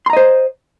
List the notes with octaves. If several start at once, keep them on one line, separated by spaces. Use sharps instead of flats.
C5 D#5 A#5 C6